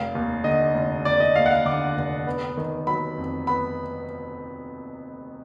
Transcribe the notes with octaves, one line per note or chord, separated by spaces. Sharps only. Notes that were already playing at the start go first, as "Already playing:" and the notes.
Already playing: F1 F5
D#2
D3 D#5
F1
F1 D5
D#5
D#2 F5
F#5
F5
D3 D6
F1
B3
D#3
F#3 B5
F2
B3 B5